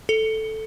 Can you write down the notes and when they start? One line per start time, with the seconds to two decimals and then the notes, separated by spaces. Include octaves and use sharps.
0.09 A4